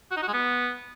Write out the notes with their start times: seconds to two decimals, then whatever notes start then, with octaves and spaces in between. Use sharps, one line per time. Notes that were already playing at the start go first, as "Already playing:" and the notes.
0.11 F#4
0.17 D#4
0.22 F#4
0.28 G#3
0.33 B3